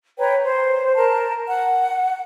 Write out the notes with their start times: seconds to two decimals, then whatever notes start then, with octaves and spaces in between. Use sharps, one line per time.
0.19 B4 C#5 G5 A#5
0.43 C5
0.96 A#4 A5
1.48 F#5